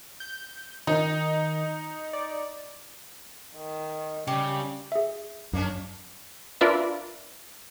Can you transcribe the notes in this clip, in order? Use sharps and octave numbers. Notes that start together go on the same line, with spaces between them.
G6
D#3 D#4
D5
D#3
C#3 G3 G4
G#4 E5
F#2 A#3 C#4 D4
D4 F4 A#4 B4 D5 E5